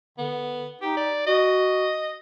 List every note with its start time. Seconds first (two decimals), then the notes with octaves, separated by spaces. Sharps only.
0.18 D3 B3
0.82 D#4 G4
0.97 D5
1.27 F#4 D#5